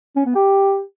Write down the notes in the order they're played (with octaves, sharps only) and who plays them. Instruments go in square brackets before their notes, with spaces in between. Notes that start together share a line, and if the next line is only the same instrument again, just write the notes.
[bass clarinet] C#4
B3
G4